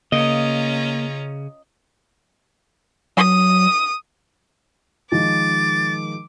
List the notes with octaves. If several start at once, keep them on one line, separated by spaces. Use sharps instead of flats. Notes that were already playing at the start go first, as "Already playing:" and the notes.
C#3 A#3 C#4 F4 D#5 A#5
F#3 D#6
D#3 F3 G#3 D6 A6